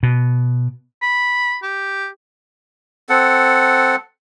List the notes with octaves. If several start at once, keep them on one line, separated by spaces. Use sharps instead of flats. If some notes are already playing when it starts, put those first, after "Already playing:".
B2
B5
G4
C4 A4 F#5